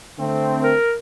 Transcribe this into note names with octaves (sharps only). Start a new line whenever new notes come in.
D3 A3 C4
A#4